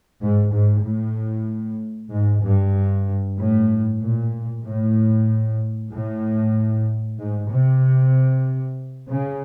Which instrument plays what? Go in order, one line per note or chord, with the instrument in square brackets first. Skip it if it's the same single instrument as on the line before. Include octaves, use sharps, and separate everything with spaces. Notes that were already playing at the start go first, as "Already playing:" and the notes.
[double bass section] G#2
G#2
A2
G#2
G2
A2
A#2
A2
A2
G#2
C3
C#3